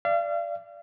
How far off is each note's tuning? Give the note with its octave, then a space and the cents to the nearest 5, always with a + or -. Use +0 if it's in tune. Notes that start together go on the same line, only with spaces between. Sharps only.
D5 +0 F5 -40